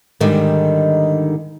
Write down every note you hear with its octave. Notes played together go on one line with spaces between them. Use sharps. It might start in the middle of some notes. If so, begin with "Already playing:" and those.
G#2 D3 D#3 G3